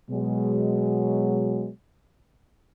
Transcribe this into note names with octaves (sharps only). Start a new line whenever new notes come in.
B2 F#3 G#3